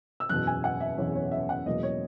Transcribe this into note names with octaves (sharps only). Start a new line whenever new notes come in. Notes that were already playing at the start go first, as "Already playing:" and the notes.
E6
F#1 E2 B2 F#6
G#5
F#5
E5
F#1 E2 B2 C#5
C#5
E5
F#5
E1 E2 B2 F#3 A#3 D#5
C#5